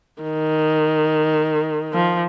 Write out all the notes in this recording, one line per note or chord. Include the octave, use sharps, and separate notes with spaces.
D#3
F3